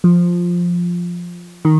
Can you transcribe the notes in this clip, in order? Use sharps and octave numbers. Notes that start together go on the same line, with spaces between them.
F3
D#3